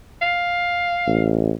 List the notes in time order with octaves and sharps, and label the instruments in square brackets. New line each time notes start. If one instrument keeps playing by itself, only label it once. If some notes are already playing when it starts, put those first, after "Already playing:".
[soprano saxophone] F5
[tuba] A1